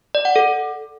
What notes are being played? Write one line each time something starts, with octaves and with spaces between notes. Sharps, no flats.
D5
F#5
A4